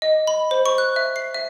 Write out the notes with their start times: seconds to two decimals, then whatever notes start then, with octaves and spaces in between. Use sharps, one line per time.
0.02 D#5
0.27 B5
0.51 C5
0.66 C#6
0.78 F#6
0.96 E5
1.16 C7
1.34 E5